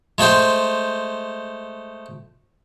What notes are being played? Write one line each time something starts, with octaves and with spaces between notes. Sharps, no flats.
G#3 A3 C5 G5